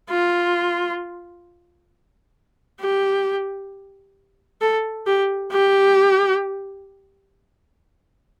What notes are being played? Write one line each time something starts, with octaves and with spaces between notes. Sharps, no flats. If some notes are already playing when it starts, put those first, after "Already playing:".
F4
G4
A4
G4
G4